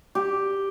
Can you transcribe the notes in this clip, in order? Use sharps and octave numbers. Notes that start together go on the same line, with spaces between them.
G4